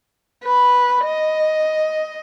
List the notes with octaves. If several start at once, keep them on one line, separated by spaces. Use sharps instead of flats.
B4
D#5